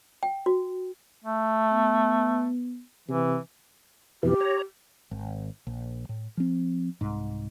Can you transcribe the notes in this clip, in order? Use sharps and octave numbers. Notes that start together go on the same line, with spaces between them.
G5
F#4
A3
B3
C3 E3
F2 B2 E3 G4
C#5 A#5
G#1
A#1
A2
F3 C4
C2 G#2